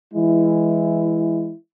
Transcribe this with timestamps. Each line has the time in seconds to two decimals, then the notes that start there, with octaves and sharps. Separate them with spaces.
0.11 E3 G#3 E4